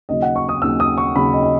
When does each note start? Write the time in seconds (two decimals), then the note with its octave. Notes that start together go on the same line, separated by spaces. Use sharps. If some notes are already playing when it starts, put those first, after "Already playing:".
0.09 D#2 C#3 F#3 D#5
0.22 F#5
0.36 C#6
0.49 D#6
0.62 D#2 C#3 F#3 E6
0.80 D#6
0.98 C#6
1.15 D#2 C#3 F#3 B5
1.33 D#5
1.44 D#5